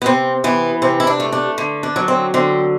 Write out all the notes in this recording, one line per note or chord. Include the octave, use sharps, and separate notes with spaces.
B3
C3 C4
E3 B3
C3 C4
E4
D4
A3
D4
D3
D4
F#3
C4
D3 C4